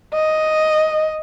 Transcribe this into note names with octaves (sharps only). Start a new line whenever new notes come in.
D#5